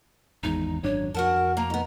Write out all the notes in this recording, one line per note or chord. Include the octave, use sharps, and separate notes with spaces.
G#1 E2 G#2 D#4
G#1 F#2 D4 C#5
F2 F#4 A#4 F#5 A5
A#3 A#5
D#3 B3